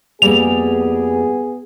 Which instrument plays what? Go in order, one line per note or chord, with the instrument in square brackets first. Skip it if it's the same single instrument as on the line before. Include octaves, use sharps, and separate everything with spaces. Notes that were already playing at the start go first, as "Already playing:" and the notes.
[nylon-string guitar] F2 G3 A#3 [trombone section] B3 G#4 [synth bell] F7